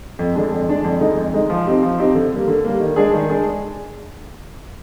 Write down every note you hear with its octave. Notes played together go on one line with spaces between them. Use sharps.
F2
D3 G#3 D4
F2
D3 G#3 D4
F2
D3 G#3 D#4
F2
D3 G#3 D#4
F3
C4 D#4 G4
F3
C4 D#4 G4
D3
G3 A#3
D3
G3 A#3
D#3
G#3 D4 G#4
D#3
G#3 D4 G#4